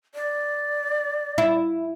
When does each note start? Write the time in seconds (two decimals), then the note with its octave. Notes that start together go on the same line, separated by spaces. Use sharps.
0.15 D5
1.38 E4